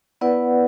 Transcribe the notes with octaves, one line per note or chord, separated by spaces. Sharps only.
B3 E4 B4 D5 F#5